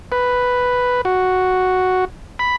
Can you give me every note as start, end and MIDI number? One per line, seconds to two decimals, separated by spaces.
0.12 1.01 71
1.05 2.05 66
2.39 2.56 83